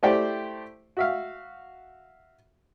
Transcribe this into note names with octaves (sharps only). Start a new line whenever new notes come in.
A3 E4 G4 C5 D5 G5
F#4 E5 F5